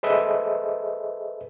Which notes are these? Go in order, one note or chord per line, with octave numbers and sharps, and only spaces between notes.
G#4 A4 B4 C5 D#5 E5